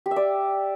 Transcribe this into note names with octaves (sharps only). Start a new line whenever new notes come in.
G4
E5
D5